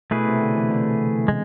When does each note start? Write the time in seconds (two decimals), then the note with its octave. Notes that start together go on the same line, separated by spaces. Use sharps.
0.11 B2 A3 E4 G#4 B4
0.27 C3
0.41 D3
0.56 E3
0.70 D3
1.28 G#3